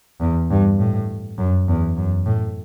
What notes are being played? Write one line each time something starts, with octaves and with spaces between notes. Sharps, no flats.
E2
G2
A2
F#2
E2
F#2
A2